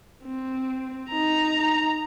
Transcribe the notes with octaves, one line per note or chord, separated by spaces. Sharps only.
C4
D#4 A#5